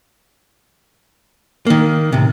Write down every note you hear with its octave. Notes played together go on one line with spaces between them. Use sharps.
D#3 A#3
A2 C3